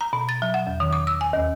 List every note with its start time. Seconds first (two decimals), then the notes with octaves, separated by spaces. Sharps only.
0.01 A#5
0.13 B2
0.29 A6
0.42 F#3
0.54 F#5
0.67 E2
0.80 D#3
0.93 D6
1.07 E6
1.21 G#5
1.33 D#2